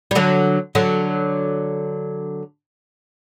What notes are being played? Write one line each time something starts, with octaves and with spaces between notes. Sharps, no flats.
G3
D3 F#3
D3 F#3